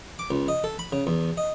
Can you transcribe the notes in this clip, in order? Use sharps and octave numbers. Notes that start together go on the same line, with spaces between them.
D6
C#2
D#5
A4
B5
C#3
E2
D#5